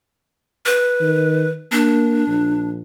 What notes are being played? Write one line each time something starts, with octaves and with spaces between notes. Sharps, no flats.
B4
D#3
A#3 D4
A#1